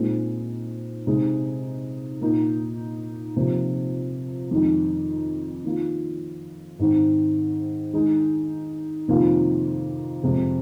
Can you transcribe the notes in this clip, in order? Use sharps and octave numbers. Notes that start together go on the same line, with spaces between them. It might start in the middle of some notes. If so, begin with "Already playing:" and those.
Already playing: A#2 G#3 C4 D#4
C3 G#3 D#4
A#2 A#3 D#4
C3 F3 A#3
F2 D#3 G#3 D#4
D#3 A#3 F4
G#2 D#3 C4
D#3 G#3 D#4
F2 C3 D#3 A#3 F4
F2 C3 G#3